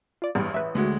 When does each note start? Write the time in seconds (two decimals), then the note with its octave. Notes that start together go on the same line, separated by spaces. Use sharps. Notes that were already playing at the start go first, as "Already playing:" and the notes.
0.22 F4 D5
0.35 A1 E2 G2 G3 B3
0.54 A1 B4 E5
0.75 D2 G#3 F#4